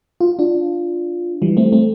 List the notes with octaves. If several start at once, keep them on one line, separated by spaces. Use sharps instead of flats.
F4
D4 F4
E3 G3
A3 C4
A3 C4